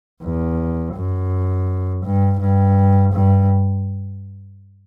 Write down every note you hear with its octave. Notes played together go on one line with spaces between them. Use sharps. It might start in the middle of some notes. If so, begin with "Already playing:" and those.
E2
F#2
G2
G2
G2